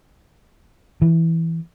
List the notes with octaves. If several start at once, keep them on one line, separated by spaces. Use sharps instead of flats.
E3